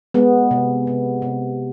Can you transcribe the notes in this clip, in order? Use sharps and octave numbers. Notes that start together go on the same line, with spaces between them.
G#3 B3
C3
C3
C3